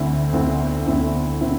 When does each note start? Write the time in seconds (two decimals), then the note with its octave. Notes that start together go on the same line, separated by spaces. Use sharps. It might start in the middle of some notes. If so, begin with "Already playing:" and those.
Already playing: D2 D3 C4 E4
0.32 D2 D3 C4 E4
0.86 D2 D3 C4 E4
1.41 D3 C4 E4